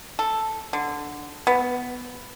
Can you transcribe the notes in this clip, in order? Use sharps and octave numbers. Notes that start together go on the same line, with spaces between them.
A4
D3
B3